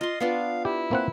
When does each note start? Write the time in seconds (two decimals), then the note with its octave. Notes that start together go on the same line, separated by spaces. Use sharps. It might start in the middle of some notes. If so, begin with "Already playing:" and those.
0.01 F4 D#5 C6
0.20 B3 D4 F4 F5
0.65 E4 G4
0.91 A#3 C4 F#5